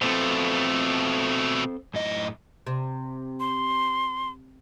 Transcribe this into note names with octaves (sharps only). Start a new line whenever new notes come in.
B2 A3 C4 A4 C5
F#2 A2 D#5
C3
C6